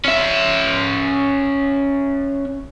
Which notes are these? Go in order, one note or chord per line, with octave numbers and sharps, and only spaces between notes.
C#4 E5